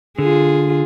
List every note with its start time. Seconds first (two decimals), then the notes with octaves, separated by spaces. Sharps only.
0.19 D3 F4 G#4